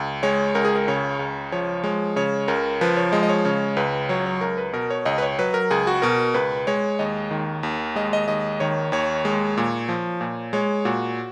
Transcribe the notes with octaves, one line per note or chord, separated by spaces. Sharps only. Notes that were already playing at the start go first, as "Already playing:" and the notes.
Already playing: C#2
G#3 C#5
C#2 A#4
G#4
A#4
C#3 C#5
C#2
F3 C#5
G#3 C#5
C#3 C#5
C#2 A#4
F3 B4
C#5
G#3 D#5
D#5
C#5
C#3 C#5
C#2 B4
F#3 C#5
C#5
C#2 A#4
B4
B2 A#4
C#5
C#2 D#5
B4
C#5
F#3 B4
A#4
C#2 G#4
F#4
B2 A#4
C#2 B4
G#3 C#5
D#2 D#5
D#3
D#2
G#3 D#5
D#5
D#2 D#5
D#3 C#5
D#2 C#5
G#3
A#2
F3
A#2
G#3 C#5
A#2 F#4